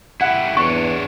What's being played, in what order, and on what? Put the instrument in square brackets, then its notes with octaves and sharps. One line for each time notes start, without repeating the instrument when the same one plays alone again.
[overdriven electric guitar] E4 G4 [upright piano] F#5
[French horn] E2 [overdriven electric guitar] D4 C#5 [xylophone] C#6